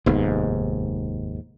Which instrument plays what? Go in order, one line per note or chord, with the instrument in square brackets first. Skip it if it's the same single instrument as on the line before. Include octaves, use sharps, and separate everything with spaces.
[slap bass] F1 B3 [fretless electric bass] D#2 G#2